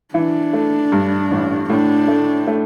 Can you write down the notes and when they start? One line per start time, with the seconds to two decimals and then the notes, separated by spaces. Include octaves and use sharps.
0.14 E3 D4
0.53 A3
0.92 G2
1.31 A1
1.70 A2 D4
2.08 A3
2.47 A3